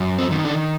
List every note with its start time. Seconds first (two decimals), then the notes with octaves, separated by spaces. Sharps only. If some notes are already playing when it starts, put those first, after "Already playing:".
Already playing: F#2
0.19 C4
0.31 D#3
0.45 D4